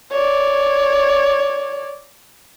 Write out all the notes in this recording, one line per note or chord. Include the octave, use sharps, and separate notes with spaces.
C#5 D5